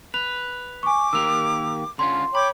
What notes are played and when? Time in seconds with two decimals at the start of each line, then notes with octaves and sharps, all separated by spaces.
0.14 B4 F7
0.83 G#5 C#6 D6
1.13 D#3 A#3 G4 E6 F7
1.99 D3 C#4 F4 C6
2.35 C#5 G5 B5 D6